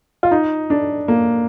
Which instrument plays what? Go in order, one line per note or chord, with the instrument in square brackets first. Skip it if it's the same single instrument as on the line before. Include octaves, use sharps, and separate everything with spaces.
[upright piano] F4
D#4
D4
A#3